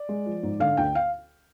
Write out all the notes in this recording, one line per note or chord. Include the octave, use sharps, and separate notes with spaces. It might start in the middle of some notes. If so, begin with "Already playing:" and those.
Already playing: D5
G#3
F3
G#2
D3 F5
D2 G5
F5